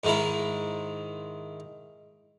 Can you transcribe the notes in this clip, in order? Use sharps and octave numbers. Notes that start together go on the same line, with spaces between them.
G#2 D#3 G#3 E4